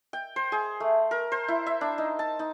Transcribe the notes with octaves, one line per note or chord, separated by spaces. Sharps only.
G5
C5
G#4
A3
A#4
C5
E4
E5
D4
D#4
A5
D#4